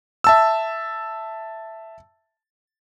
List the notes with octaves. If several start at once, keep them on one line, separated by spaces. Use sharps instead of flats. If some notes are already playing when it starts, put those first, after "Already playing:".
E5 A5 E6